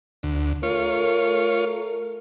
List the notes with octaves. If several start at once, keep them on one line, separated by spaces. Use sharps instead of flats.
D2
A3 F4 A#4 C#5